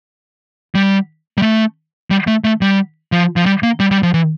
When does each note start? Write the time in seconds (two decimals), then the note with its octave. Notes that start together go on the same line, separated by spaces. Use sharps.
0.75 G3
1.38 G3
1.42 A3
2.11 G3
2.27 A3
2.44 A3
2.61 G3
3.12 F3
3.36 F3
3.46 G3
3.63 A#3
3.80 G3
3.91 G3
4.03 F3
4.14 E3